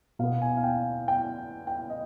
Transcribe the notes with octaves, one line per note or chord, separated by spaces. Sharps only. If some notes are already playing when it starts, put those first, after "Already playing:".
B2 B3 F5
G#5
F5
G5
G5
G5
D#5